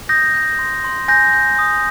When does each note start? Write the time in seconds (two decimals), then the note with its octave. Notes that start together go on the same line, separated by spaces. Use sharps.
0.09 D#6 G6 A#6
0.34 G6
0.59 C6
0.84 C6
1.08 G#5 G6 A#6
1.33 G6
1.59 D#6